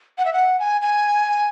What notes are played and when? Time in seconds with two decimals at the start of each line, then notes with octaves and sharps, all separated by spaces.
0.18 F#5
0.25 E5
0.33 F#5
0.59 G#5
0.81 G#5